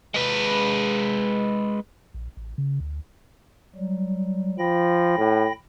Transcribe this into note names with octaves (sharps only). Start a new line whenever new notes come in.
G#3 B4
A#1
A1
C#3
D2
F#3 G3
F3 G5 B5 A#6
A2